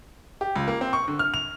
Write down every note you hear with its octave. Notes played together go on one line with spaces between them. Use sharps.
G4
C#2
A#3
C4
C#6
D3
F6
F7